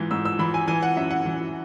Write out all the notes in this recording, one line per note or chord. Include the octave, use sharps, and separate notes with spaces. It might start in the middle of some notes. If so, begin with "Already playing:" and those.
Already playing: G#2 E3
G#2 E6
E6
E3 B5
G#5
E3 G#5
F#5
F#2 E5
F#5
E3